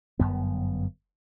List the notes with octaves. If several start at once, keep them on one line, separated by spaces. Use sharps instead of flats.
G1 F#2 B3